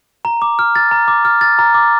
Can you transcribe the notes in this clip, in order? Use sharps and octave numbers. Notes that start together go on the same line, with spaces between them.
A#5
D6
F6
A6
A#5
D6
F6
A6
A#5
D6